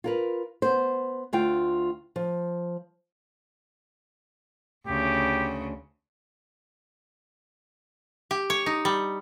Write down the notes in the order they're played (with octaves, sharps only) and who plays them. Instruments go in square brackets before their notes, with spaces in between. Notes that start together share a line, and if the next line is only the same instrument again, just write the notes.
[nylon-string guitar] F4 A#4 B4
B3 C5
D2 F4 G5
F3
[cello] D2 C#3 [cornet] G4
[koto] G4
C#5
D#4
G3